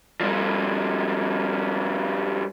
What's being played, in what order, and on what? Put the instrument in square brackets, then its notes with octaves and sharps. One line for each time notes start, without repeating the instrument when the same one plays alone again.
[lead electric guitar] G2 F3